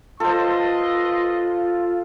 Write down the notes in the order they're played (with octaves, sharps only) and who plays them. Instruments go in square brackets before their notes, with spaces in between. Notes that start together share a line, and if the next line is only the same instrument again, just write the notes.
[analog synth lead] F4 [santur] A4 C5 [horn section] B4 D#5 C6